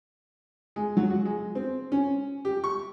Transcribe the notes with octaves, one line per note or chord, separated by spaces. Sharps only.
G#3
F#3
F#4
G#3
C4
C#4
G4
C#6